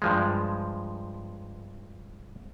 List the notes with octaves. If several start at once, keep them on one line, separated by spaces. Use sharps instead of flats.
G2 F3 G#3